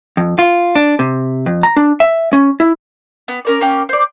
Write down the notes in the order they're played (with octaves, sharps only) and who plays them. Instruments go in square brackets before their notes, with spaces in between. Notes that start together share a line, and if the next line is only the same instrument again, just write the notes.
[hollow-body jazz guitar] F2
F4
D4
C3
F2
A#5
D4
E5
C#4
E4
[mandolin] B3
C#4 A#4 D5
A#3 C#4 G5
C5 D5